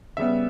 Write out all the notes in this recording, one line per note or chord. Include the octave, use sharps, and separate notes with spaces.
C#3 G3 B3 E5